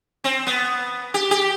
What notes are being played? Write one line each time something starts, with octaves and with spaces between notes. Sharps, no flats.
C4
B3
G4
G4